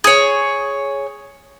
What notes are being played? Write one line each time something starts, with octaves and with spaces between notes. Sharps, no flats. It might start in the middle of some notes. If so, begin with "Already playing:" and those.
G#4 C#5